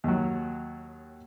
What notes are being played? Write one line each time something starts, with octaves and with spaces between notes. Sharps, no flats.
D#2 F#3